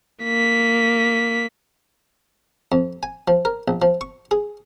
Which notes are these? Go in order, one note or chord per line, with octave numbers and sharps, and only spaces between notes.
A#3 B6
F2
G#5
F3
A#4
A#1
F3
C#6
G#4